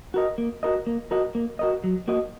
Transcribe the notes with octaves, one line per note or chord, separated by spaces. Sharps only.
F#4 A#4 D#5
A#3
F#4 A#4 D#5
A#3
F#4 A#4 D#5
A#3
F#4 A#4 D#5
F#3
A#3 F#4 D#5